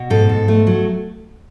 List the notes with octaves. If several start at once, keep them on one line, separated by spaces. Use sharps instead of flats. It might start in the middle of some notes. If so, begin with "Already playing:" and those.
Already playing: B2
G#2 A4
G#2
A3
F#3